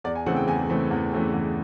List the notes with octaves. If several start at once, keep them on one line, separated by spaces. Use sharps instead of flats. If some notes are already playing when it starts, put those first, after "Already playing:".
E2 D5
G#5
C#3 E3 A3 C4 F#5
G5
E2 G#5
C#3 E3 A3 C4
E2
C#3 E3 A3 C4
E2